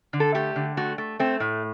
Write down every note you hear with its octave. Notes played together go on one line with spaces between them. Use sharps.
D3
A4
A3 G4
D3
A3 F#4
A3
A3 C4
A2